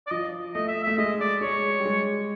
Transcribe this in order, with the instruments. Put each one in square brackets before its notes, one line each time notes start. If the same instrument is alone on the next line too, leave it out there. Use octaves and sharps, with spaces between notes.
[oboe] D5
[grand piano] F3 [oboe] D#5
[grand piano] A3 [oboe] D#5
[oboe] E5
[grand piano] A3 [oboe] E5
[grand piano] G#3 [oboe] D#5
[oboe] D5
[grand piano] G#3 [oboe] C#5
[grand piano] G3
G#3